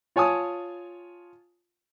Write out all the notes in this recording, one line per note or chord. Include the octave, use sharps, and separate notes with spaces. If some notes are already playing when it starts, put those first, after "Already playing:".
F4 C#5 G#5 A5 D#6